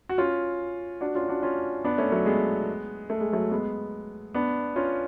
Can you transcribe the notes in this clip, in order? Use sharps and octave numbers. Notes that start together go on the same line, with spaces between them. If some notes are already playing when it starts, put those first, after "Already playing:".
F#4
C#4 F4
D4 F#4
C#4 F4
D4 F#4
C#4 F4
B3 D4
A3 C#4
F#3 A3
G#3 B3
A3
G#3
F#3 A3
G#3 B3
B3 D4
C#4 F4